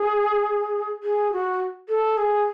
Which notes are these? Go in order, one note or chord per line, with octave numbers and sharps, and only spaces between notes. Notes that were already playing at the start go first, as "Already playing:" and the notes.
Already playing: G#4
G#4
F#4
A4
G#4